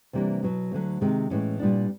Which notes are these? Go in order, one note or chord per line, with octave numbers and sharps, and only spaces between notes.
C3 E3 G3 A#3 D4
B2 F#3 B3
D2 D3 F#3
C3 D#3 G#3
A2 E3 G#3 C#4
A#2 G3 B3 D4